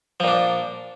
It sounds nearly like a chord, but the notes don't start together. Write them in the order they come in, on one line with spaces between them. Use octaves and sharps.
F3 A#2 D4